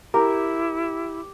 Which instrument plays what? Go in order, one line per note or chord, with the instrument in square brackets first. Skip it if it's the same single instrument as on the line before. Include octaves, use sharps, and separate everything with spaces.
[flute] E4 [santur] G4 [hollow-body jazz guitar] A#4